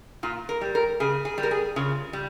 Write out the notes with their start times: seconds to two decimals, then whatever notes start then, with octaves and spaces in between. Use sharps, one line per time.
0.23 A#2 F4
0.49 A#4
0.61 G3
0.75 A#4
1.00 C#3 G#4
1.25 G#4
1.38 G3
1.43 A#4
1.51 G#4
1.76 C#3 F4
2.13 G3